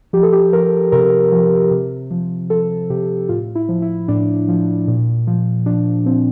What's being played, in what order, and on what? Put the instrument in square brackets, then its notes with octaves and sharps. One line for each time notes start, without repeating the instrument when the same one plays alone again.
[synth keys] F3 G4
A4
G4
F3 A#4
C3 A#4
F3
C3
F3
F3 A4
C3 G4
A2 F4
E4
F3
E4
A2 D4
F3
A#2
F3
F3 D4
F3 C4